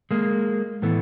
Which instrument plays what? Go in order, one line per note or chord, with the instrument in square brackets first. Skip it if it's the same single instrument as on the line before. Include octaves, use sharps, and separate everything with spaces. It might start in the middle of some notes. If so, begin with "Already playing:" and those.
[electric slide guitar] G#3 A#3
A2 E3 A3 B3